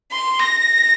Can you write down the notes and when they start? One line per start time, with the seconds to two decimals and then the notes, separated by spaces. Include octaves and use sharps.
0.12 C6
0.39 A#6